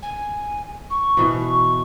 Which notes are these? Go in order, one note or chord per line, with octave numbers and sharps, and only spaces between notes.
G#5
C#6
B2 E3